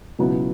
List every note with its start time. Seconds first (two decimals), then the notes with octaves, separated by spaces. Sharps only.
0.19 C#2 B2 F#3 B3 E4